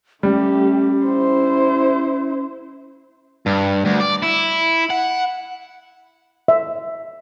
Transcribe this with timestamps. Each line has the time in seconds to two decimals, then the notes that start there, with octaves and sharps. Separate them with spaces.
0.23 G3 A3 C#4 G4
1.05 E4 C5
3.46 G2
3.85 D2
4.00 D5
4.22 E4
4.90 F#5
6.48 E5